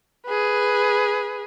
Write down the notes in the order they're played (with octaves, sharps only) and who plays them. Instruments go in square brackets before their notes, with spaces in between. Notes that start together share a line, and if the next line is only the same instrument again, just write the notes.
[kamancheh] G#4 B4